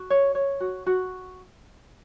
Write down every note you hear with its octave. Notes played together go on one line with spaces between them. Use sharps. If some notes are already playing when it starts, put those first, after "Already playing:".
Already playing: F#4
C#5
C#5
F#4
F#4